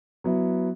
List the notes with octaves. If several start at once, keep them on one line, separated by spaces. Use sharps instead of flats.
F#3 B3 E4